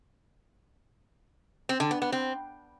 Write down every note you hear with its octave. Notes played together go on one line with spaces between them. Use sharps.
C4
D3
B3
B3
C4